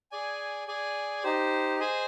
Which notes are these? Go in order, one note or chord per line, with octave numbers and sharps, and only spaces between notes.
G#4 D5 G#5
G#4 D5 G#5
D#4 G4 C5
G#4 C5 D#5 G#5